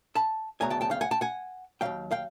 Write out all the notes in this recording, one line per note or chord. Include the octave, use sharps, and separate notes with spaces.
A5 B5
D2 C#3 F#3 B3 G#5 A#5
G5 A5
G5 A5
F5 G5
F#5 G#5
G5 A5
F#5 G#5
D#2 C#3 F#3 F5 G5
F5 G5